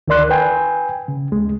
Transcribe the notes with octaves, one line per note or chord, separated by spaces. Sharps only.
D2 D#3 A#4 D5 C6 F#6
B4 G5 G#5
C#3
D2 G#3